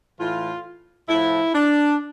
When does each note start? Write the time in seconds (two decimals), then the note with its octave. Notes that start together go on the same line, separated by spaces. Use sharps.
0.19 A2 E3 F4
1.08 A2 F3 E4
1.53 D4